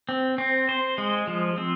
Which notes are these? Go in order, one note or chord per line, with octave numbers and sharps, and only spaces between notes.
C4
C4
C5
G#3
F3
C4